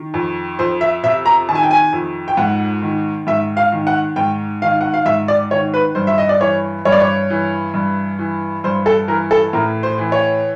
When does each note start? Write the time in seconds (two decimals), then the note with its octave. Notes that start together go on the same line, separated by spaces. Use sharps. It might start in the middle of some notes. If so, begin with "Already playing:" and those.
Already playing: D#3
0.14 F2
0.59 F2 C5
0.81 E5
1.03 C3 E5
1.26 A#5
1.49 D#3 A5
1.55 G#5
1.63 G5
1.71 G#5
1.93 F2
2.28 G5
2.37 G#2 F#5
2.82 D#3
3.27 G#2 E5
3.57 F5
3.72 D#3
3.87 F#5
4.16 G#2 G5
4.62 D#3 F5
4.81 F#5
4.94 F5
5.06 G#2 E5
5.28 D5
5.51 D#3 C#5
5.74 B4
5.95 G2 C5
6.07 E5
6.18 D#5
6.29 D5
6.40 E3 C#5
6.85 G2 C#5
6.92 D5
7.00 C#5
7.30 E3
7.74 G2
8.19 E3
8.64 G2 C5
8.86 A4
9.08 E3 A#4
9.31 A4
9.53 A2 A#4
9.83 C5
9.98 E3
10.12 C#5